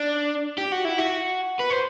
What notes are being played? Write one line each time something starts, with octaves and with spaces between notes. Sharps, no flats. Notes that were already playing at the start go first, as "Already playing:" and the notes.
Already playing: D4
G4
F#4
E4
F#4
B4
C5